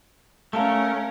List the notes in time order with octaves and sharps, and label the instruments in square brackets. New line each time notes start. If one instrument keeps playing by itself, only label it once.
[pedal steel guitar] A3 [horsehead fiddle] C#4 A#4 [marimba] F5 A5